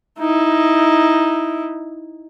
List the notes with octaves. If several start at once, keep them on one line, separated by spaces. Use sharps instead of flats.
D#4 E4